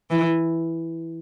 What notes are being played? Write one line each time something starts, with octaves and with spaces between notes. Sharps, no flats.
E3